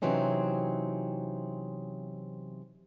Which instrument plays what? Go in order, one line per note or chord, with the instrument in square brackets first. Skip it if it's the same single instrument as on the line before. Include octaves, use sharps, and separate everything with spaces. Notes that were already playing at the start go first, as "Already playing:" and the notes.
[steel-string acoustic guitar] C3 E3 F#3 C4 C#4 D#4